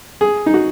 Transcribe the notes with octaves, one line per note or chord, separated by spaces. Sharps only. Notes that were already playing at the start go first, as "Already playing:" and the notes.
G#4
D#4
F#4